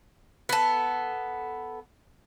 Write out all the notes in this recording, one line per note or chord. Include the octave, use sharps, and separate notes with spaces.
B3 A4